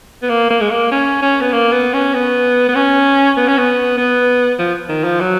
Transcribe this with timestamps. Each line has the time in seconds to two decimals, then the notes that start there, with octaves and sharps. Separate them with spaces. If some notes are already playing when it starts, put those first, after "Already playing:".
0.22 B3
0.29 A#3
0.50 A#3
0.61 G#3
0.70 A#3
0.91 C#4
1.22 C#4
1.41 B3
1.53 A#3
1.72 B3
1.94 C#4
2.14 B3
2.69 B3
2.75 C#4
3.37 B3
3.48 C#4
3.58 B3
3.97 B3
4.59 F3
4.89 D#3
5.04 F3
5.20 F#3